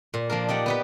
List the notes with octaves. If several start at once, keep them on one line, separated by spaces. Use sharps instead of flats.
A#2
F3 A#3 D4 A#4
D#4 G4 D5 F#5
B3 G4 B4